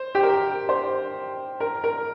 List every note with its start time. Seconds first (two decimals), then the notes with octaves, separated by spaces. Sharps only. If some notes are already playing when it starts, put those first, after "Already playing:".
Already playing: C5
0.15 G4
0.23 A#4
0.69 C5
1.60 A#4
1.84 A#4